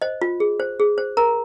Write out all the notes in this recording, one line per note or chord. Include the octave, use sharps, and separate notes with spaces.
C5 D#5
F4
G#4
C5
G#4
C5
A#4 A#5